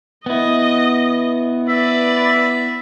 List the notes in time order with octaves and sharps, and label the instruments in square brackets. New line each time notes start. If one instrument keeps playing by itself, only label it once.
[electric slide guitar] B3 E4 [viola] D#5
[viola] B4 D5 [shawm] E5